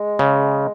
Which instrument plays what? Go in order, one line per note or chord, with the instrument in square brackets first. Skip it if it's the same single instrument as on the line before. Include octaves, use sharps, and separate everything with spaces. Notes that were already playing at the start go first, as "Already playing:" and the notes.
Already playing: [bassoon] G#3
[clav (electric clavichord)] C#3